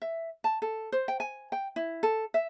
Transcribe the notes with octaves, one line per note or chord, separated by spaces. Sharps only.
E5
A5
A4
C5
G5
G#5
G5
E4
A4
E5